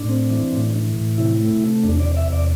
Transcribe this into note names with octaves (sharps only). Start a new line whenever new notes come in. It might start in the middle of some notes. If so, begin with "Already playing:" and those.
Already playing: A2 D4
C4
E3
A2
E3
A2
C3 E4
A3
C3
E2 D4
D5
C3
E5
E2 D5